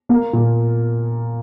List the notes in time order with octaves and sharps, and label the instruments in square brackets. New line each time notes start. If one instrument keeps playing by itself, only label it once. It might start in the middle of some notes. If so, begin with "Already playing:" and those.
[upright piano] A#3
A#2